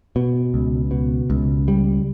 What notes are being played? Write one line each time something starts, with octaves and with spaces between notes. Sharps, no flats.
B2
C#2
B2
C#2
G3